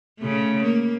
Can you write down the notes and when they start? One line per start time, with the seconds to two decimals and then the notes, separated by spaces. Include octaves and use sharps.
0.19 C#3 A3
0.63 A#3